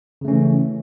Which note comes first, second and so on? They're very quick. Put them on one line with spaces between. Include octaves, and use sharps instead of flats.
C#3 A3 C#4 E3